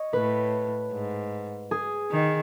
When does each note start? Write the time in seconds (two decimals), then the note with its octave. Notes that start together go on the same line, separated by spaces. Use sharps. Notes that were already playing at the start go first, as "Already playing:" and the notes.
Already playing: C#5 D#5
0.13 A2 B4
0.92 G#2
1.71 G#4
2.11 D#3